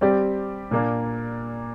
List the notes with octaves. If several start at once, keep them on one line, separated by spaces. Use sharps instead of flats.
G3 C4 G4 D5
A#2 A#3 D4